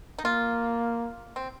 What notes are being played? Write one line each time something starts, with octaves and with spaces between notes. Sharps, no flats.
D#4
A#3 F4
C4